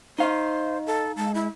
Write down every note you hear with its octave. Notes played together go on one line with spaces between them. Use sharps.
D#4 C5 D#5 F5
A4
G#3 A5
E4